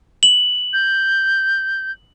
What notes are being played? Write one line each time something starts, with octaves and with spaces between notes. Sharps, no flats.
F#7
G6